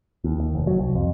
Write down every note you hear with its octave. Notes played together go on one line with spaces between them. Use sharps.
D#2
D#2
F1
F#3
C2
F2